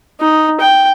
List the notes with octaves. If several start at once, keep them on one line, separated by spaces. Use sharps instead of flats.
D#4
G5